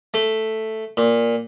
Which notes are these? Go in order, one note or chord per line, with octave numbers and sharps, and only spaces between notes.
A3
A#2